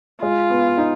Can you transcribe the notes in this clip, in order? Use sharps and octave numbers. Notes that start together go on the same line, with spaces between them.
G#3 F4
B3
D#4